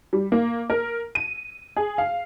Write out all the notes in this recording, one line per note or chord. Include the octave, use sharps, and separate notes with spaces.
G3
A#3
A#4
D#7
G#4
F5